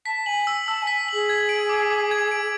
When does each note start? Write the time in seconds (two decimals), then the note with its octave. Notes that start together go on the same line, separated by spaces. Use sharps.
0.06 A5 B6
0.26 G#5 F#7
0.47 E6
0.67 A5 E6
0.82 G#5 B6
1.08 G#4 F#7
1.29 G#6
1.49 D7
1.69 D6
1.90 D6
2.11 G#6
2.31 D7